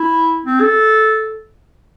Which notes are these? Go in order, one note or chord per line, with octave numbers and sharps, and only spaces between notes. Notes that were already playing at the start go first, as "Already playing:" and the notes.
Already playing: E4
C4
A4